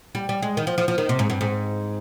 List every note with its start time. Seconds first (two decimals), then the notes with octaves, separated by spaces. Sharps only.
0.15 G3
0.29 G3
0.42 G#3
0.57 D#3
0.67 F3
0.78 F3
0.88 F3
0.98 D#3
1.09 C3
1.19 G#2
1.30 G2
1.41 G#2